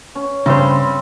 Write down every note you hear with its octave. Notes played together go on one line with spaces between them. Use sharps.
C#4
G2 C#3 C4 C5 B5